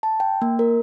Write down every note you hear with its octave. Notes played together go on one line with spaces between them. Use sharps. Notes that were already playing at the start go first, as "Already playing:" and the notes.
A5
G5
A#3
A#4